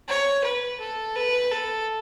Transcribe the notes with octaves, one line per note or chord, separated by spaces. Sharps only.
C#5
B4
A4
B4
A4